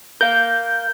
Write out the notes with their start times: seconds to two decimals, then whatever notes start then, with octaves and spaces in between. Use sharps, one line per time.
0.21 A#4 F5 G6